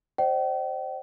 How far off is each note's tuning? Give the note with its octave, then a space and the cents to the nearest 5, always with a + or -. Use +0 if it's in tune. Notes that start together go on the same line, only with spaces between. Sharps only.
C5 +15 D#5 -45 G5 -40